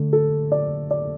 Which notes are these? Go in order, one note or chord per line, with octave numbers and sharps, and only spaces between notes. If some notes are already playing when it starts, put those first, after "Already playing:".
Already playing: D3 A3
A4
D5
D5